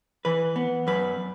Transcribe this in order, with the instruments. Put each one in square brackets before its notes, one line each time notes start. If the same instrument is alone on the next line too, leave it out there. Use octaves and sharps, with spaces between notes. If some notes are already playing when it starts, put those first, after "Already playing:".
[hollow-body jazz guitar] E3 B4
B3
F#2 B4